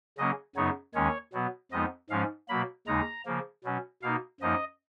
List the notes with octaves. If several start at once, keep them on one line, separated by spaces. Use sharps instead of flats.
C#3 F#3 A#3 C#4 D#5
F#2 C#3 F#3 B3 D#4 C#5
D#2 D#3 G#3 C#4 C#5
B2 F#3 B3
F2 F3 G#3 B3 D#4 D#5
G#2 F3 G#3 C#4 F5
B2 F#3 A#3 B5
D#2 C#3 G#3 D#4 A#5
C#3 F3 A#3
B2 F#3 C#4
B2 A#3 D#4 F5
F#2 F3 A#3 D#4 D#5